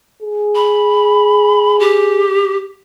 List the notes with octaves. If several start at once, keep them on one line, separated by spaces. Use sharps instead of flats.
G#4
B5
G4